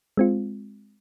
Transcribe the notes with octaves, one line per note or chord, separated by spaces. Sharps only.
G#3 C4 F4